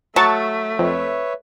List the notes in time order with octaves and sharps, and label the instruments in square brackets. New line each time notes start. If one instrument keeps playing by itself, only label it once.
[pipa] F#3 [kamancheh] A3 [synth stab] A5 C#6 A6
[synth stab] F2 [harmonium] B4 C#5 E5